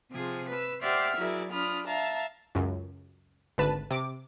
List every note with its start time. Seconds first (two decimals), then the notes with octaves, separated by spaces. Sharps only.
0.11 C3 F3 G#4
0.50 B4 E6
0.82 G4 C5 D5 E5 F#5 F6
1.17 F#3 E4 F#4 G#4 A#4 D5
1.52 D4 F4 B5 D#6 F6
1.87 E5 F5 A5 A#5
2.55 C#2 F#2
3.58 G#1 D2 B4 A5
3.91 C3 D6